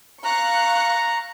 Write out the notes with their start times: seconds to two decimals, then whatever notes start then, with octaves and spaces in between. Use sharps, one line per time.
0.24 F5 A#5 C#6 F#6